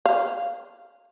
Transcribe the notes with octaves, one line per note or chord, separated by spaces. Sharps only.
F5